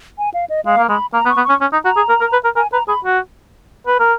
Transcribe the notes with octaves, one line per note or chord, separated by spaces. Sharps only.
G#5
F5
D#5
G#3 F5
A#3
G#3 B5
A#3 A#5
B3
C#6
B3
C#4 C#6
C#4
D#4
F#4 A#5
G#4
A#4
A#4
B4
A#4
A#4 G#5
B4 A#5
G#4 B5
F#4
B4
A#4